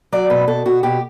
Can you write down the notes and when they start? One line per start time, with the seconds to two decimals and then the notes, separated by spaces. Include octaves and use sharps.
0.12 F#3 D5
0.30 B2 B4
0.47 B2 A4
0.66 B2 F#4
0.83 B2 G4